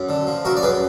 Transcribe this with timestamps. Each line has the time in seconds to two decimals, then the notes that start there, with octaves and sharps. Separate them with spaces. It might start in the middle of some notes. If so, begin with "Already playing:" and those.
Already playing: F#2
0.09 D3
0.27 F3
0.45 F#2 F#4 A#4
0.57 D5
0.63 F#2 G#4 B4